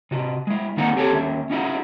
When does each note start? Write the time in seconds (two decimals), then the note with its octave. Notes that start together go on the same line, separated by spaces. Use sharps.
0.11 C3 F#4
0.47 G#3 E4
0.77 D#3 A#3 C4 D#4 F#5
0.96 C4 G4 A4 C#5 A5
1.12 D#2 C#4 E5
1.50 C#4 D#4 E4 F#4